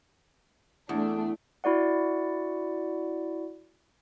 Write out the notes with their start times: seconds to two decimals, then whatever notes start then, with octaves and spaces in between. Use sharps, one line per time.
0.89 E2 A3 D4
1.64 E4 F#4 D5 F#5